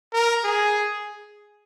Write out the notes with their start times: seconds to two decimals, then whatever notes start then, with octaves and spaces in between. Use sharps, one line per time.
0.13 A#4
0.44 G#4